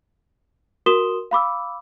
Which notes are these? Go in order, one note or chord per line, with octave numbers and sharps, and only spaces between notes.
F#4 A#4 C6 D#6 E7 G7
F5 B5 D6 E6